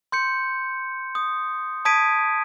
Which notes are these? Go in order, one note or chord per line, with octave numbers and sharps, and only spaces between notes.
C6 G6 C#7
D#6
A5 D#6 G#6 B6 D7 D#7